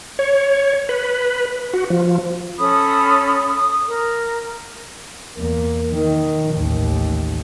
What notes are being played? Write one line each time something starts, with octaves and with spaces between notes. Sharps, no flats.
C#5
B4
F#4
F3
C#4 A4 B5 D#6
D#6
A#4
E2 A#3
D#3
A1 D#2